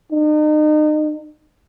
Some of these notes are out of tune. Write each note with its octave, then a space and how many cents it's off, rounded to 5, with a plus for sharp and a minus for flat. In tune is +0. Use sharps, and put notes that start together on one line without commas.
D#4 -35